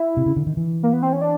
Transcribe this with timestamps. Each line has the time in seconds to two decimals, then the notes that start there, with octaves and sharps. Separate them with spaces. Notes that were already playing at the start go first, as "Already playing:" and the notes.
Already playing: E4
0.17 C3
0.26 C#3
0.36 D3
0.47 D#3
0.57 E3
0.83 A#3
0.93 B3
1.03 C4
1.13 C#4
1.21 D4